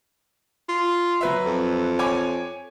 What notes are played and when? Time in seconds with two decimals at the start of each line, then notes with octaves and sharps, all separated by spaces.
0.69 F4
1.21 F#3 B4 E5
1.45 F2
1.99 C#5 G#5 D6